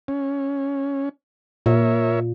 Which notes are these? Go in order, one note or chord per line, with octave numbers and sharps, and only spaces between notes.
C#4
A#2 A#4 C#5 E5